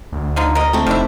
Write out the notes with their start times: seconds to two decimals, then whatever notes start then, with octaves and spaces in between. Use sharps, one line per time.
0.12 D2
0.36 D3 F3 D#4
0.55 A#4 D#5
0.73 A3 C4
0.87 F1 D#3 D4 E4